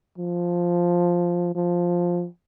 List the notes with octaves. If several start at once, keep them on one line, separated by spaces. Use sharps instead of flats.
F3
F3